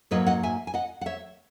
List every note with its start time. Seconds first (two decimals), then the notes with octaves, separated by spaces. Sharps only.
0.11 G#2 F#3 A#3 B4 D#5
0.26 D#5 F#5
0.43 E5 G#5
0.67 G#5
0.74 D#5 F#5
1.01 F#5
1.06 C#5 E5